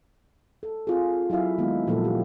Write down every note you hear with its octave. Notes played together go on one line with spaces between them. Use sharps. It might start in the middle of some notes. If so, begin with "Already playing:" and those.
A4
C4 F4 G#4
F#3 E4 F#4 E5 F5
D#3 G#3 A#3 B3 D#4
A#2 F3 F#3 A#3 A4
D#4 G4